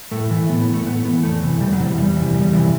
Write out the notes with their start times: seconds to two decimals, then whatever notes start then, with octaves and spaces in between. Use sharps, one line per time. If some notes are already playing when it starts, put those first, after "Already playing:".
0.11 A2 A3
0.31 E3
0.49 A2 B3
0.61 B3
0.68 E3
0.74 A3
0.86 A2 B3
1.05 E3 B3
1.23 E2 A3
1.43 C3 E3
1.60 E2 G3
1.73 F#3
1.80 C3 E3
1.86 G3
1.98 E2 G3
2.16 E3
2.21 C3
2.34 E2 G3
2.53 C3 E3